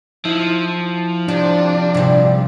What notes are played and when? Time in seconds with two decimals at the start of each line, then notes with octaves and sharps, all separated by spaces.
0.25 F3 E4
1.28 C3 D4
1.95 A#1 G#2 C3 G3